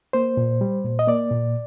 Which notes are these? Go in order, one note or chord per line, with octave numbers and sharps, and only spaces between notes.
A#3 C5
A#2
G3
A#2
D#5
A#3 D5
A#2